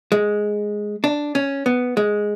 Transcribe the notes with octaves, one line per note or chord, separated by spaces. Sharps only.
G#3
D4
C#4
B3
G#3